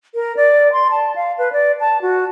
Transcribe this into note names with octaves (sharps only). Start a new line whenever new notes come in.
A#4
D5
C6
A5
F5
B4
D5
A5
F#4